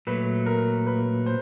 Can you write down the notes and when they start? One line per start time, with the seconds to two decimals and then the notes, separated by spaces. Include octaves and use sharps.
0.07 A#2 F#3 A3 B4
0.46 A#4
0.87 B4
1.26 C5